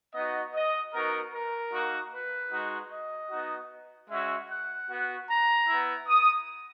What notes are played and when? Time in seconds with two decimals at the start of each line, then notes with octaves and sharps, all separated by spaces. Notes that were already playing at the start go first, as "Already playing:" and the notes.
0.14 B3 D#4 F#4 D#5
0.54 D#5
0.93 B3 D#4 F#4 A#4
1.33 A#4
1.72 A#3 D#4 F#4
2.12 B4
2.52 G#3 D#4 F#4
2.91 D#5
3.30 B3 D#4 F#4
4.09 G#3 C#4 F#4 E5
4.49 F#5
4.89 B3 F#4
5.28 A#5
5.68 B3 E4
6.08 D#6